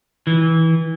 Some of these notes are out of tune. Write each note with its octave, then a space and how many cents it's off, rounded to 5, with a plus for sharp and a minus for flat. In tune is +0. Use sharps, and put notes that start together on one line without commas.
E3 -20